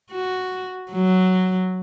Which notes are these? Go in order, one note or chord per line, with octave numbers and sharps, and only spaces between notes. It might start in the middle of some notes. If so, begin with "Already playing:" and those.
F#4
F#3